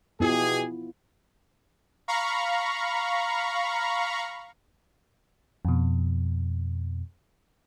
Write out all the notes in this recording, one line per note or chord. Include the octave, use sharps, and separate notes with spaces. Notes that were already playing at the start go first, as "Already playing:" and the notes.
B2 B3 E4 F4 G4 G#4
F5 A#5 B5 C#6
F2 B2